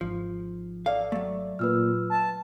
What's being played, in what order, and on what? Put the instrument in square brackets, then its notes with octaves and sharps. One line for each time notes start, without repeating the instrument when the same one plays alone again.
[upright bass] G#1 D#4 [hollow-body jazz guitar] F3
[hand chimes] A4 D5 E5 [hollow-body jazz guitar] F5
[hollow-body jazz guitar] F#3 A3
[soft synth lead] A#2 [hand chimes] B4 E6 F6
[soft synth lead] A5